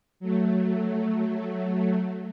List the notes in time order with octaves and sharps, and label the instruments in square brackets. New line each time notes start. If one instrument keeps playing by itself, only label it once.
[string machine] F#3 A3